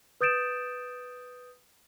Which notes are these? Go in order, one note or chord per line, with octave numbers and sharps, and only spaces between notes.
B4 D#6 G6 A6 D7 E7